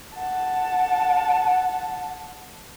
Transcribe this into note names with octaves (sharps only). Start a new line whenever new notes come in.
F#5 A5